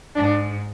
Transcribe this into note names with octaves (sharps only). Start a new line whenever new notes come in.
G#2 D4